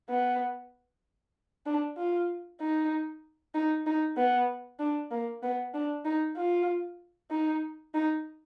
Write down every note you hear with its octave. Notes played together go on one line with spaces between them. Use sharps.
B3
D4
F4
D#4
D#4
D#4
B3
D4
A#3
B3
D4
D#4
F4
D#4
D#4